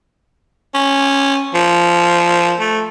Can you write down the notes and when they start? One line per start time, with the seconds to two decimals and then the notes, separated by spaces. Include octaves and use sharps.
0.74 C#4
1.54 F3
2.60 A3